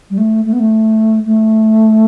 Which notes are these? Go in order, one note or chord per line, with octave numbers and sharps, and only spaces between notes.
G3
A3
A3
B3
A3
A3